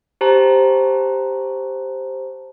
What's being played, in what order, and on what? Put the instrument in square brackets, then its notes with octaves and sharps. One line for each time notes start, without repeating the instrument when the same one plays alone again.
[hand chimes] G4 C5 A5 A#5